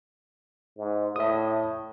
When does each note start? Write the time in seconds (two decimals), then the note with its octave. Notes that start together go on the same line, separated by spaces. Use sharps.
0.78 G#2
1.16 A2 E5 D#6